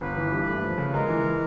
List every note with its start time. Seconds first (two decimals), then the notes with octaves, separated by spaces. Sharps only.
0.01 G1 B4
0.16 E3
0.32 G2
0.48 A3
0.63 F3
0.78 C#3
0.93 G#3 A#4
1.08 E3